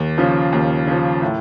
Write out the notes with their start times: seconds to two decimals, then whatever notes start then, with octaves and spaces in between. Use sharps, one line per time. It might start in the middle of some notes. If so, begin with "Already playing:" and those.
Already playing: D#2
0.18 C#3 F3
0.52 D#2
0.87 C#3 F3
1.22 A2